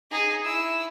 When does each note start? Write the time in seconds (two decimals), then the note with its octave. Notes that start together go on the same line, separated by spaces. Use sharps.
0.11 D#4 G#4
0.44 E4 E6